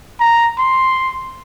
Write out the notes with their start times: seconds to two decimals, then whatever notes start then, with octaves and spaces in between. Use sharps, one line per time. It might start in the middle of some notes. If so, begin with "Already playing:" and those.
0.20 A#5
0.58 C6